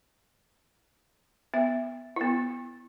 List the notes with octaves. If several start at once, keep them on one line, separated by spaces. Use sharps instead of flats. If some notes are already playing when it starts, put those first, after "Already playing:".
B3 E5
B3 E4